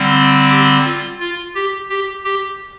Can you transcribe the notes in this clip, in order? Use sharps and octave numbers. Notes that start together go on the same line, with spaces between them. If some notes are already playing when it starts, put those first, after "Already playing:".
Already playing: D3 G3 C4
G4
F4
F4
G4
G4
G4